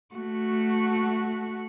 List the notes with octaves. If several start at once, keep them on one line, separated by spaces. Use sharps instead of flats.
A3 F#4